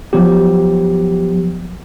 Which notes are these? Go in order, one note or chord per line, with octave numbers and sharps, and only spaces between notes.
F3 F#3 B3 G4